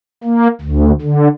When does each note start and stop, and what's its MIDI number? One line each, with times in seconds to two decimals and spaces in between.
0.24 0.48 58
0.61 0.92 38
1.02 1.28 50